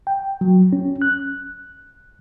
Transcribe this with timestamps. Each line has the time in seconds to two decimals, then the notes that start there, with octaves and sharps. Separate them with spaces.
0.07 G5
0.41 F#3
0.73 C#4
1.02 F#6